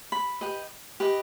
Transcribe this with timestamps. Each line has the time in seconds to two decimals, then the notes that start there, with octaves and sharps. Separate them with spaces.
0.12 B5
0.41 G4 B4 D#5
1.00 G4 B4 D#5